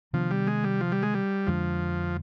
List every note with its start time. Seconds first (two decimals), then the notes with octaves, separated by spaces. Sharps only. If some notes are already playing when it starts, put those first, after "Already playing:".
0.13 C3 D#3 F3 B3 D4
0.31 G3
0.47 G#3
0.64 G3
0.81 F3
0.92 G3
1.02 G#3
1.14 G3
1.47 F2 D3 F3 G#3 D4